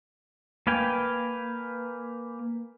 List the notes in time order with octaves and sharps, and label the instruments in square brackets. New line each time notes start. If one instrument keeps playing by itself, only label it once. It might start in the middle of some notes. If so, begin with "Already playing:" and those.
[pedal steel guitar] A#3 B4 F5 G5 G#5